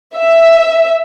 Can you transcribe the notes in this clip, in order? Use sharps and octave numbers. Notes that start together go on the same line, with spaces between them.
E5